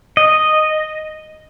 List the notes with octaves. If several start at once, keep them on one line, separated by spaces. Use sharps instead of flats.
D#5